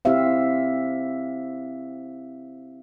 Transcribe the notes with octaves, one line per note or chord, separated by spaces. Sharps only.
C4 E4 G4 C5 E5 F5